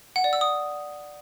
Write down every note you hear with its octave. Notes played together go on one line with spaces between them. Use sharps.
F#5
D5
E6
D#6